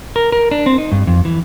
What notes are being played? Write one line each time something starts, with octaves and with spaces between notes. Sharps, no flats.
A#4
A#4
D4
C4
D#4
G2
F2
E3